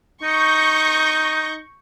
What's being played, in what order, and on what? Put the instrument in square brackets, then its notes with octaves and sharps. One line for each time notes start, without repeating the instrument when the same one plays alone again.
[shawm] D#4 [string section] C#6 G6 A#6